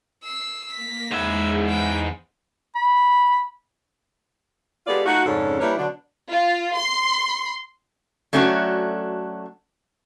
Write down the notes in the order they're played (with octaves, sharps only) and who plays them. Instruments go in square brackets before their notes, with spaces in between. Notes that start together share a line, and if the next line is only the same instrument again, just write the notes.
[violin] E6 C7
[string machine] A#3 A#6 [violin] B6
[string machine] E2 G#3 [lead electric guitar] G#2 E5 [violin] B5 G#6
[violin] G5 B5
[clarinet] B5
[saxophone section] G#3 B3 F4 G4 A4 D5
A3 D#4 F4 F#4
F2 G#2 C#3 C#4 D4 A4
G3 A#3 D4 E4 B4 C#5
B2 D3 F#3 D4
[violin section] F4
C6
[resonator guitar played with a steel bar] F#3 A3 C#4 D4 F#4